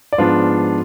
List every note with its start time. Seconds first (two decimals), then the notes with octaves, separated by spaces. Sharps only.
0.13 D5
0.18 G#2 F3 B3 D4 F4 F5